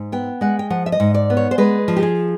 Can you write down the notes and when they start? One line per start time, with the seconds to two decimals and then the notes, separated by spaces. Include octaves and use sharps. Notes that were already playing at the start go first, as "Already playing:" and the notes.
Already playing: G#2
0.12 B3 G5
0.41 G#3 F#5
0.59 G5
0.70 F3 F#5
0.86 E5
0.92 D#5
1.00 G#2
1.14 D5
1.30 B3
1.37 C#5
1.51 C5
1.58 G#3 B4
1.88 F3
1.97 G4
2.03 G#4